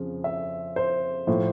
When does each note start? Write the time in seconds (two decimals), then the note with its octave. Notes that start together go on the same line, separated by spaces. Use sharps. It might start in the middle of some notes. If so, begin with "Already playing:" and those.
Already playing: F2 C#3 F3
0.24 E5
0.76 C5
1.27 A2 F3